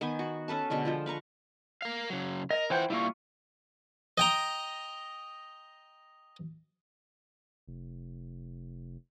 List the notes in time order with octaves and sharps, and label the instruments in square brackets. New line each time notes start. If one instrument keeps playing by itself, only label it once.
[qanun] D#3 B3 C5 G#5
F#4
C#4 A4 B4 A5
B2 D3 G#3 A4
F3 F4 C5
B4 F5 A#5 C#6
[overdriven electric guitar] A#4 F5
C#3 F#3
[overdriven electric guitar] A#4 [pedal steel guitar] D#5
[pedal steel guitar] E3 C5 G5 [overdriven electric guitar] F4 F#5
[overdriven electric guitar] G3 A#3 [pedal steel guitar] E4 F4 C#6
[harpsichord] D#5 G5 A#5
[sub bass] F1